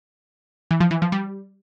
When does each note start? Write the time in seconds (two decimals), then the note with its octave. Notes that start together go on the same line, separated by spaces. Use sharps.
0.71 E3
0.80 F3
0.91 E3
1.02 F3
1.12 G3